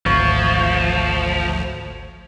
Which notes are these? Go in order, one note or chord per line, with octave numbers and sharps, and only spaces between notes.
G#1 D2 F3 C#5